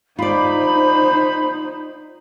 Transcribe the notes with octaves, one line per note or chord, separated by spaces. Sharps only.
D#4 F4 C5 D5 B5